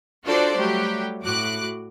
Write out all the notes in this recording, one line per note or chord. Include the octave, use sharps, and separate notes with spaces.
D4 F4 F#4 A4 C5 D5
F#3 G3 A3 G4
A2 F#4 D6 F#6